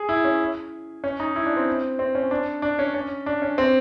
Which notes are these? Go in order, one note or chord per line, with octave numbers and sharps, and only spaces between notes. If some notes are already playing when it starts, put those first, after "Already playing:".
Already playing: G#4
E4
C#4
C#4
D#4
E4
D4
C4
C4
C#4
D4
D4
C#4
C#4
D4
C#4
C4